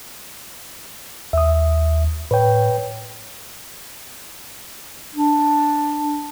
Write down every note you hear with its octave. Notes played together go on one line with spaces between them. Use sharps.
D#2 E5 D#6
A2 B4 C#5 G5
D4